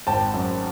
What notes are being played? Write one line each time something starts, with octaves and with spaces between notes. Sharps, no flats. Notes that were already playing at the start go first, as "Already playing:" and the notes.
G#1 G5 A5
F#2